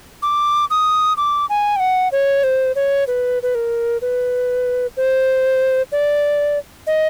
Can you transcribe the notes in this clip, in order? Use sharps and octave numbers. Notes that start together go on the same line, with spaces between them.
D6
D#6
D6
G#5
G5
F#5
C#5
C5
C#5
B4
B4
A#4
B4
C5
D5
D#5